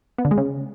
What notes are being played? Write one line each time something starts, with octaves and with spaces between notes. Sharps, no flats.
B3
D3
G#3
C#3